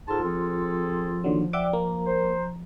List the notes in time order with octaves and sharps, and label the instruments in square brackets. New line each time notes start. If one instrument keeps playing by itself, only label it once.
[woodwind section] G#2 A4 A5 [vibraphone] F4 C6 [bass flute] G#4
[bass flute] F3 [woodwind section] C4 G#4 A4
[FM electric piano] D#2 D3 F#3
[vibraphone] D5 G5 [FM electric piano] E5 F#5 D6
[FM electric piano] A#3 [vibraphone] A#5
[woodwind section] C5